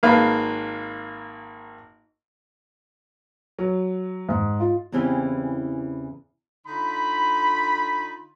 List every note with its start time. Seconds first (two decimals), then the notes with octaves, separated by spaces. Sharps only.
0.03 G#1 A#3 B4 F5
3.58 F#3
4.29 G#2
4.60 F4
4.92 E2 C#3 E3 C4 G4 G#4
6.67 D3 D#4 F4 B5